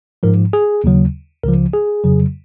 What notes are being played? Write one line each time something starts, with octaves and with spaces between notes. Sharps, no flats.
G#2 F3 A#4
G#4
D#2 C#3 F#3
C#2 C#3 F3 A#4
G#4
F2 C#3 F#3